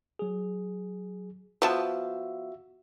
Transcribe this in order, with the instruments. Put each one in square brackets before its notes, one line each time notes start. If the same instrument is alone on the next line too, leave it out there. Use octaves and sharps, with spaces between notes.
[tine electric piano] F#3 G#4
[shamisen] F3 B3 A5 [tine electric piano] F#4 E5